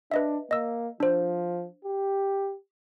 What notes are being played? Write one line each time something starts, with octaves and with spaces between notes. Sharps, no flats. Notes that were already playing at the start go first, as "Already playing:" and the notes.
D4 B4 D#5 E5
A#3 D#5 E6
F3 D4 C5
G4